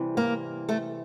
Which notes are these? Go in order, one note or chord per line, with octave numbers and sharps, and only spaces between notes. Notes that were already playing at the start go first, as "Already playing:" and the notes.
Already playing: C3 E3 G3
A#3 A#4
A3 A4